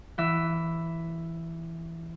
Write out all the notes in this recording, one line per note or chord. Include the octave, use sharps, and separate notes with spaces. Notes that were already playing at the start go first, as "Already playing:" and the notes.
E3 E5